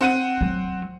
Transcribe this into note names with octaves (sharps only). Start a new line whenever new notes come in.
C4 F#5 D#7
F#3